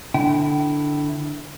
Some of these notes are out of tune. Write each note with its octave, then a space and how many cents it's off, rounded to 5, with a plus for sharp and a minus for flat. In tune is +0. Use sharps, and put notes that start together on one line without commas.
D3 +0 E4 +0 G5 -35